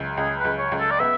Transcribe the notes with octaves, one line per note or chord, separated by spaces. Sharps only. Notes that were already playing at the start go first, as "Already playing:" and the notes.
Already playing: C#2 C#3
C#2 G#4
B4
C#2
C#5
C#2
A4
D5
B3 E5